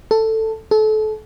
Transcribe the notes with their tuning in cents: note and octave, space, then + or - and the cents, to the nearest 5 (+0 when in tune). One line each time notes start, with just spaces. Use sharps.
A4 +10
A4 -30